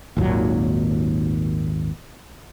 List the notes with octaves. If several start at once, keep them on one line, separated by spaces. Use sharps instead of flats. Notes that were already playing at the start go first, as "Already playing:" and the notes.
G#1 D#2 A#2 F#3